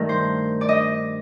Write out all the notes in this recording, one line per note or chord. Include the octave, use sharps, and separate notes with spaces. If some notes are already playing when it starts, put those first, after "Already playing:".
Already playing: G2 D#3 A3 A#4
C5
D5
D#5